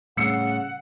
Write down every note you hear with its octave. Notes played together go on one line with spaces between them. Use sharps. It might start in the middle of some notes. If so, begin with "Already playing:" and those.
A2 C#3 G3 A3 F#5 E6 C7 C#7